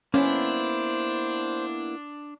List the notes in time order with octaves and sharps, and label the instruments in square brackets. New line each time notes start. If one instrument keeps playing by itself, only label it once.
[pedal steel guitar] A#3 B3 E4 [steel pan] C#4 [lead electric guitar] D4 D5 [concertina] C5